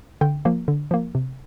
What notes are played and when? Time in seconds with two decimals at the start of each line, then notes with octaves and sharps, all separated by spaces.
0.21 D3 G5
0.45 F3 A#3
0.68 D3
0.91 F3 A#3
1.15 C3